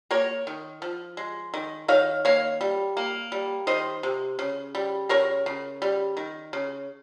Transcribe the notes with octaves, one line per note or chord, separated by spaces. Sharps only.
A#3 A#4 C#5
D#3
F3
G#3
D#3
D#3 C#5 F5
A#3 C#5 F5
G3
A#3
G3
D#3 C5 D#5
C3
C#3
G3
C#3 A#4 C#5
C#3
G3
D#3
C#3